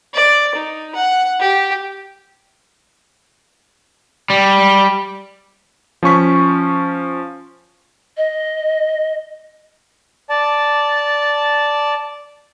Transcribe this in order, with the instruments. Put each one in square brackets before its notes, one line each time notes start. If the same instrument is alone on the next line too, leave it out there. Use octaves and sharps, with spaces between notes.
[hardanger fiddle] D5
D#4
F#5
G4
[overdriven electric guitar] G3
[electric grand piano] F3 C#4 C#6 B6
[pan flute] D#5
[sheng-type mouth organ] D5 A5